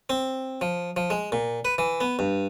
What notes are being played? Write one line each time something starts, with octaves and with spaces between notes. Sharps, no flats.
C4
F3
F3
G#3
A#2
B4
E3
B3
G2